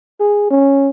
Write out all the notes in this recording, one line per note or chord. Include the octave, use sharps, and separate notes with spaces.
G#4
C#4